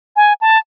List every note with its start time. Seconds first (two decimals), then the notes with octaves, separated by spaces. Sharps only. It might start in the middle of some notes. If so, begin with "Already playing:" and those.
0.16 G#5
0.41 A5